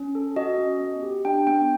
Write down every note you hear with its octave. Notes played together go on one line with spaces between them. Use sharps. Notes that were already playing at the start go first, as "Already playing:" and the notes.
Already playing: C#4
A4
F#4 D#5
C#4
B3
G4
D4 G5
B3 G5